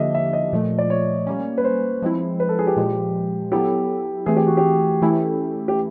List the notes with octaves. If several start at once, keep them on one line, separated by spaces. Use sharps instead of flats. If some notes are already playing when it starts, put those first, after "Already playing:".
Already playing: D3 F3 A#3 D4 G4 D#5 E5
E5
D#5
A#2 F3 A3
D5
C#5
G3 A#3 C#4
B4
C5
F3 G#3 C4 E4
B4
A4
G#4
G4
A#2 F3 G#3
F#3 B3 E4 G4 A4
E3 A3 C4 G#4
G4
F#4
G4
E3 A3 C#4 E4 A4
G4